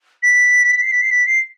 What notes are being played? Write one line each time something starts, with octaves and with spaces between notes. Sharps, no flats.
B6
C7
B6
C7
B6
C7